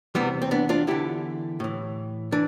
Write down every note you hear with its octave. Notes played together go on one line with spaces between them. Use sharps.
E2 C3 E3 G3 B3
C4
B3 D4
D4 F4
E2 D3 E4 G4
A2 E3
E3 D4